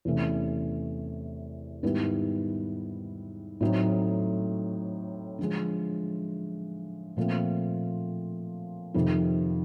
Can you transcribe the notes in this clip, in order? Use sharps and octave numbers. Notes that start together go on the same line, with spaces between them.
E2 C3 E3 A3 C#4
G#2 D#3 G3 B3 E4
A2 F#3 A3 C4 D#4
D3 F3 G#3
A#2 F3 A3 C4
F2 C3 D#3